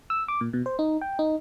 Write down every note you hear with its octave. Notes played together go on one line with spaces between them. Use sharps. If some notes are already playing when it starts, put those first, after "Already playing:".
E6
D6
A#2
B2
C5
D#4
G5
D#4